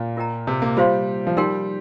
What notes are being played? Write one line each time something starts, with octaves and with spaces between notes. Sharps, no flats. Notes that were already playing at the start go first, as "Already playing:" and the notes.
Already playing: A#2
F4 A#4 D#5 G5 A#5
C3
A#3
G3 F4 C5 F5 C6
F3
G3 D#4 A#4 G5 C6